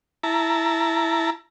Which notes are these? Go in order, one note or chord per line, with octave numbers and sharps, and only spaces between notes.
E4 A5 A#5